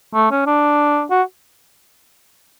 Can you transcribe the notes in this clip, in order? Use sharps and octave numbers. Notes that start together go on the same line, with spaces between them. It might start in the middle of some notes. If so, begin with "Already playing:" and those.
A3
C#4
D4
F#4